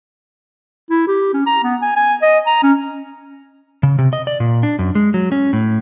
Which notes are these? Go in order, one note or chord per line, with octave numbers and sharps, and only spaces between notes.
E4
G4
C#4
A#5
B3
G#5
G#5
D#5
A#5
C#4
C#3
C3
D#5
D5
A#2
D4
F#2
G#3
F#3
C#4
A2